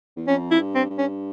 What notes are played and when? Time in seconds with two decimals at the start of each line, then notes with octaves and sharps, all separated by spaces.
0.17 E2
0.28 F2 C#4
0.51 E4
0.59 G2
0.75 C4
0.90 G2
0.98 C#4